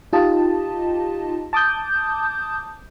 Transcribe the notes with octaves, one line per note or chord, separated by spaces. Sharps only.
D#4 F4 G4 D#5 A5
A5 D6 D#6 G6